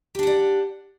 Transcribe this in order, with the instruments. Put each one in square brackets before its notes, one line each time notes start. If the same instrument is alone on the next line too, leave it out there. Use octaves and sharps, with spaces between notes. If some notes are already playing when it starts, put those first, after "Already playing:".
[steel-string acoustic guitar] G4
D4
F#5
D5